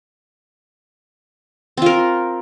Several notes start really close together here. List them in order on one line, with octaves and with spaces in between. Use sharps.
C4 F4 A#4